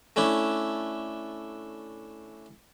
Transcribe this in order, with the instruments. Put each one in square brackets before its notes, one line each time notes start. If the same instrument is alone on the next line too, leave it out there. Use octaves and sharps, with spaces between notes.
[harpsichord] A3 C#4 D4 E4